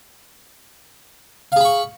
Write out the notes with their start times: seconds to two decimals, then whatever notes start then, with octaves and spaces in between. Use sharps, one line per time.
1.52 F5
1.56 G#4
1.61 B5
1.65 C#6